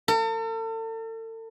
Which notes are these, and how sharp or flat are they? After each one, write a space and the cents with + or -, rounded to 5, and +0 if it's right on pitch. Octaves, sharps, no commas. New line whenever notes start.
A4 +40